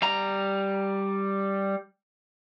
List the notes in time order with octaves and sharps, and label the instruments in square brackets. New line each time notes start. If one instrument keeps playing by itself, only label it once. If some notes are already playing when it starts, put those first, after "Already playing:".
[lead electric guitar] G3 A#5